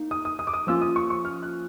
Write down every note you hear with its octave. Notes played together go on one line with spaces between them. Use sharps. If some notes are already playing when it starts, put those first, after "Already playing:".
Already playing: A#3 D#4
D#6
D#6
D#6
D6
D#6
F3 A#3 C#4 F4 E6
D#6
C#6
C#6
F6
F#6